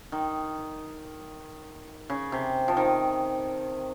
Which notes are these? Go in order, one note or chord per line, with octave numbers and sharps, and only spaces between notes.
D#3
C#3
C3
F3
D#3